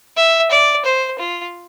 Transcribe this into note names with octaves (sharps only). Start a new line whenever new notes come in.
E5
D5
C5
F4